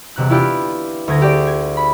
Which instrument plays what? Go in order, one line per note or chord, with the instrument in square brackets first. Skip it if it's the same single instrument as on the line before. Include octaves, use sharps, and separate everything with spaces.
[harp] E1 C3 F#6
D4 E4 F4 G4 B4
D2 G#6 A#6
G4 G#4 D5
G#6
B5